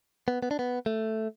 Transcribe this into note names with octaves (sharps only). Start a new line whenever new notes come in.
B3
B3
D4
B3
A3